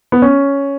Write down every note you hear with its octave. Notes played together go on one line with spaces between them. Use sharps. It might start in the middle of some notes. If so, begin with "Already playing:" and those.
B3
C#4